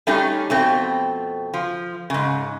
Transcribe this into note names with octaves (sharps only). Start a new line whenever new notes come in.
G3 A3 C#4 D#4 G4
F2 B2 A3 C4
F3
G#2 C#3